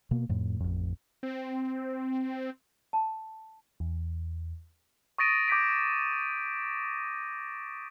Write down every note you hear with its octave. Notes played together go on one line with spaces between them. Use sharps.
B2 A#3
F2 A2
A1 F2
C4
A5
E2
C#6 D#6 A6 A#6 D7 D#7
D6 G6 A#6 B6 D7